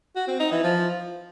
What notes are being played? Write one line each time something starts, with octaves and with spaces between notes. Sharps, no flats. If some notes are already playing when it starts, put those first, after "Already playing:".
F#4
C4
D#4
E3
F3